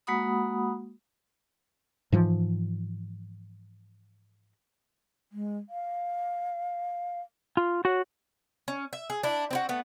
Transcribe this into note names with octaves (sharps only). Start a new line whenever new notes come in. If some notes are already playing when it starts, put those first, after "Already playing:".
G#3 A#3 F#4 F#5 B5 D#6
G#2 E3 F3
G#3
F5
F4
F#4 C#5 F#5
C#4
E5
G#4
D4 E4
C4 E4 F#4
A3 B3